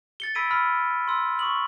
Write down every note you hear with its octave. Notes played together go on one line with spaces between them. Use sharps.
A6 C#7 G7
B5 E6 G#6 B6 D7 D#7
B5 E6 F6
C6 E6
C#6 D#6 F#7